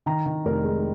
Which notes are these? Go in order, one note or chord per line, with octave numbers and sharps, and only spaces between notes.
D#3 A#5
D#3
F1 A#4
G#3